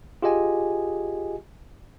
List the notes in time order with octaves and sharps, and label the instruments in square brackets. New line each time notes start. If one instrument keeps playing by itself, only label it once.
[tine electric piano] F4 G4 G#4 D#5 G#5